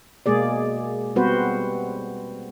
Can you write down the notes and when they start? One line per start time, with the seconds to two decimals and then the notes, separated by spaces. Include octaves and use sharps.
0.26 B2 G#3 A#3 G#4 D5
1.16 G3 B3 C4 F#4 B4 C5